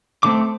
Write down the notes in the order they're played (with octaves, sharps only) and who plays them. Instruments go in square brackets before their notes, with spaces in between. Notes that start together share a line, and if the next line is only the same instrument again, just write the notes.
[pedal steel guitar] D3 A3 C4 D6